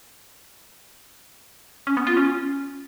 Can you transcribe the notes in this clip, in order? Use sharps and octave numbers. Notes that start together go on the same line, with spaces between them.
C#4
B3
F4
C#4